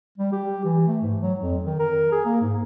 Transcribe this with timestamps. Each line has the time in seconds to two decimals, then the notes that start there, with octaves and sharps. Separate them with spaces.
0.18 G3
0.32 G4
0.65 E3
0.87 A3
1.02 G#2
1.22 F#3
1.41 F2
1.65 D#3
1.80 A#4
2.12 G#4
2.26 A#3
2.42 G#2